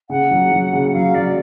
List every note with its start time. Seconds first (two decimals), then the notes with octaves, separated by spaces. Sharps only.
0.10 C#3 F#5
0.31 F#3
0.52 F#3
0.73 C#3
0.93 F#3 F5
1.14 F#3 D5